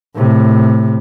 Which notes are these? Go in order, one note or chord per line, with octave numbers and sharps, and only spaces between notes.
A2 C3